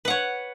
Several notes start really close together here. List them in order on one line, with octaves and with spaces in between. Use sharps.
B4 F#5 C#5